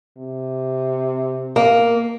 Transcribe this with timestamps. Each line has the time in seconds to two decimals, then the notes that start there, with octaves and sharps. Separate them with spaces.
0.18 C3
1.56 A#3